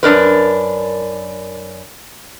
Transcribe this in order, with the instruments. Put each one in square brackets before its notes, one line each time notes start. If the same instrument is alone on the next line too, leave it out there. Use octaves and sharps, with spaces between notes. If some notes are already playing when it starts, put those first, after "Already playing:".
[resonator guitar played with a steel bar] F#2 D4 A#4 B4